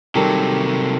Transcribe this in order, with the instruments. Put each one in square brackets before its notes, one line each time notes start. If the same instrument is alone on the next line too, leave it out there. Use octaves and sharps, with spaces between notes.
[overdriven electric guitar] C3 F#3 [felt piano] D#3 G3 [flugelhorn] G4 [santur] A4 A#4